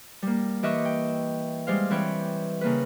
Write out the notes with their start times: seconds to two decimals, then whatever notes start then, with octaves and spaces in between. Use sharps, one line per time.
0.22 G3 A#3
0.63 E3 G4 D#5 E5 C#6 F#6
0.85 G5
1.67 G3 G#3 C5 F5
1.90 E3 C4 B4 C#5 G5
2.61 C#3 A#3 B4